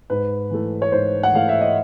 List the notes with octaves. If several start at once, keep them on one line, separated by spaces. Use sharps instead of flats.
G#2 B4
E3 A3
C#5
G#2 C5
F#5
E3 A3 F5
E5
D#5